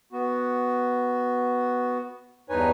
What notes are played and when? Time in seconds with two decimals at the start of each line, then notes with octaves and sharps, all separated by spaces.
0.12 B3 F#4
2.50 E2 G2 D#4 B4 C#5 G#5